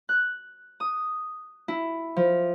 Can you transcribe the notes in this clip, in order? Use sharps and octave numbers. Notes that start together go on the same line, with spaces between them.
F#6
D#6
E4
F3